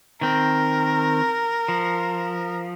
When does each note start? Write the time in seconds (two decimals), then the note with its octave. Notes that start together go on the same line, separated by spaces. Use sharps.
0.21 D#3 C4 A#4
1.68 F3